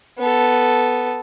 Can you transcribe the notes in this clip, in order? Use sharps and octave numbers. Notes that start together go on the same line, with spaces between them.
B3 A4